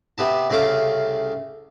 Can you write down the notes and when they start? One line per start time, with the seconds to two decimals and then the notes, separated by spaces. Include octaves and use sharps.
0.18 C3 B3 A5
0.50 C2 C#3 A3 F5 D6